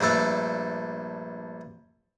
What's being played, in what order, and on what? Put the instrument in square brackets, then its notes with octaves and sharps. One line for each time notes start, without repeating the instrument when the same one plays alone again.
[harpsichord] A#1 G2 A3 A4